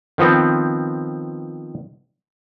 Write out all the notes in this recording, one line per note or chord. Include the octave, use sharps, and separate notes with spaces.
D#3 F3 B3 C4